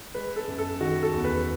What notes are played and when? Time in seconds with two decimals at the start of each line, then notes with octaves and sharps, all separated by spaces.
0.15 G#3 B4
0.36 A4
0.48 F#2
0.58 A4
0.81 D#3 F#4
1.03 A4
1.13 E2
1.24 B4